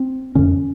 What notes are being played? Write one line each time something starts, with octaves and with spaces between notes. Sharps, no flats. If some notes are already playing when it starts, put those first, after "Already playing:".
Already playing: C4
F2 D3 C#4